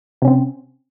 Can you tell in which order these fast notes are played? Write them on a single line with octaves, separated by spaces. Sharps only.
C3 C#4 C4